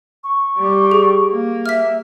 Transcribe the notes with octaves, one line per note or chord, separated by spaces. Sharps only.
C#6
G3
G#4
A#3
E5 F6 B6